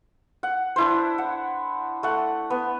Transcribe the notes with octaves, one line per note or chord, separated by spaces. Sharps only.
F#5
D4 E4 C5
F#5
A3 F#5
B3